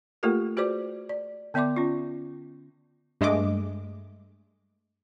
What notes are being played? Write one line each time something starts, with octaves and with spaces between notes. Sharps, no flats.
A3 A#3 F4 G4 A4 A#4
F#4 G#4 B4 C5 D5 D6
D5
D3 B3 D5 E5 C6 D6
C#4 F4
G2 G#3 A3 D#5 D6